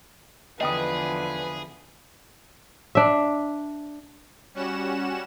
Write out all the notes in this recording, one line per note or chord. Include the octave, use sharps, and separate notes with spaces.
E2 D3 F3 G#4 B4 D#5 G5 D#6
D4 E5
G3 C#4 F#4 F#5 E7